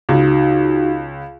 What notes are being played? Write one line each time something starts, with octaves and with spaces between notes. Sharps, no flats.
C#2 D#4 F#4